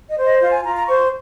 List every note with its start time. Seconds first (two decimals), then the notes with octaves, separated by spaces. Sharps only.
0.09 D#5
0.17 C5
0.25 D#5
0.40 F4 F5
0.52 G#5
0.64 F4 A#5
0.76 A#5
0.87 C5 C#6